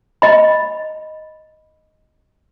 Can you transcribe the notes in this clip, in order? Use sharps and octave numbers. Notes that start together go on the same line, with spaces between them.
D#5 B5